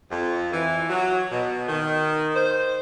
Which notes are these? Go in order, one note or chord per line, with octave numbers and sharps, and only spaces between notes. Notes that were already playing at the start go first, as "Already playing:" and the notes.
F2
E3
F#3
B2
D#3
C5